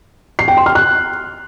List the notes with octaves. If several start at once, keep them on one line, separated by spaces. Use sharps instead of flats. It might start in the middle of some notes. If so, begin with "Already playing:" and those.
C7
G5
C6
F6
F#6